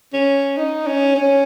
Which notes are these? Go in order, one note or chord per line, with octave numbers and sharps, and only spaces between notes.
C#4
D#4
C#4
C#4